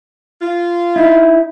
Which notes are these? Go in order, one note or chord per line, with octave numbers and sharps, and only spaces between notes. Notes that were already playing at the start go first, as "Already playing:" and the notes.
F4
D#4 E4